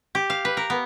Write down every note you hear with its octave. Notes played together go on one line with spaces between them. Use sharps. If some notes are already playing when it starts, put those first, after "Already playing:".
G4
F5
B4
A#4
B3